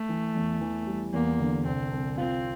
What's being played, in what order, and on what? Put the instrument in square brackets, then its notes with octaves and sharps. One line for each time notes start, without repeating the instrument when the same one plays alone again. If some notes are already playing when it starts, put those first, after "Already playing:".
Already playing: [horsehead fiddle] A3
[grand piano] E3
E2
E3
G3
[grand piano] E2 [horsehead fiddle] A#3
[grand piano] D3
[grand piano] C2 [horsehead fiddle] C4
[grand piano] C2
[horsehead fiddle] C4 [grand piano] F4